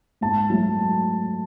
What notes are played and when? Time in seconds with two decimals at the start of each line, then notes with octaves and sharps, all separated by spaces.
0.21 G#2 A5
0.50 F#3 A3